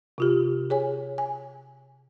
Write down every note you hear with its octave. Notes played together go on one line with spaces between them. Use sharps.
C3 F4 G4
G#4 C#5 G#5
G#5